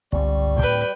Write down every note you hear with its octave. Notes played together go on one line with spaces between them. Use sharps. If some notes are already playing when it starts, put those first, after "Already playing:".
G1 C#2 G2 G3 C4
D2 A2 C4 B4 G5